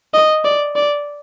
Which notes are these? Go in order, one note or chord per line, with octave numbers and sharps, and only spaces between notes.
D#5
D5
D5